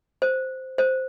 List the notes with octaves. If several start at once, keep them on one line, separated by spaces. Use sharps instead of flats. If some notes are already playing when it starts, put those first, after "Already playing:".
C5
C5